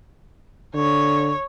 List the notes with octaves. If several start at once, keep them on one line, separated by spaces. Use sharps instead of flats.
D3 C#5